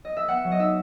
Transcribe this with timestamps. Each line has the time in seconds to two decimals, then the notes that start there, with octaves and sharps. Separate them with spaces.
0.05 D#5
0.17 E5
0.28 B3 F#5
0.44 F#3
0.51 D#5
0.59 D#4 E5